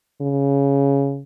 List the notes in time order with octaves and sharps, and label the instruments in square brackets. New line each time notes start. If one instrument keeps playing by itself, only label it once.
[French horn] C#3